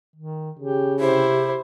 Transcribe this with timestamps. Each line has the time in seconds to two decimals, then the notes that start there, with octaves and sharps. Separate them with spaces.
0.16 D#3
0.59 C#3 G4
1.00 C3 E4 G4 C5